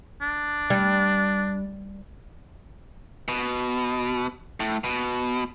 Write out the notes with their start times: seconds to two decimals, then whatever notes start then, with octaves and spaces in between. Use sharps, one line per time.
0.21 D4
0.70 G3
3.28 B2
4.60 A2
4.84 B2